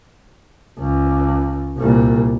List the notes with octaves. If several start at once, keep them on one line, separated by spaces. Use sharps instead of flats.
C#2
C2 A#2